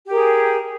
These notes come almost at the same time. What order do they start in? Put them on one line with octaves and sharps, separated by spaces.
G4 A#4 G#4